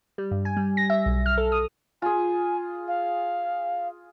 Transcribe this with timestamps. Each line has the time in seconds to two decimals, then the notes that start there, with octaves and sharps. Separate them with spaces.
0.18 G3
0.31 G2
0.45 G#5
0.57 G3
0.77 A#6
0.90 E5
1.06 B1
1.26 F6
1.38 A4
1.52 D#6
2.02 F4 G#4 G#5
2.87 F5